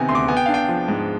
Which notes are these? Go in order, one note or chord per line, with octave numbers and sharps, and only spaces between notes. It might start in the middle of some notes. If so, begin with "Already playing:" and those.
Already playing: C3 D#3 B3 G#5
D2 C6
D6
B3 G#5
G5
D4 F5
G5
F3
G#2